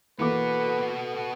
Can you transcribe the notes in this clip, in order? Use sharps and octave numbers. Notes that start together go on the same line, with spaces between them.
E3 A#3 B3 F#4 A4 B4 D6